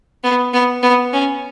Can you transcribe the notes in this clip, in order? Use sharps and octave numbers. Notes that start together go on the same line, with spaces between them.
B3
B3
B3
C#4